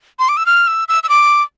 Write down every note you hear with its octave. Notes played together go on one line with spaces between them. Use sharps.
C6
D6
E6
F6
E6
E6
E6
D6